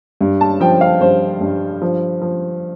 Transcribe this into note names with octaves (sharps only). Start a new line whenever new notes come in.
G2
A5
F3 G5
F5
G2 C5
G2
F3
F3